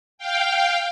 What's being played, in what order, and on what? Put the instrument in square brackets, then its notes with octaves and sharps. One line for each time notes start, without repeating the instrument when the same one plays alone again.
[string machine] F5 G5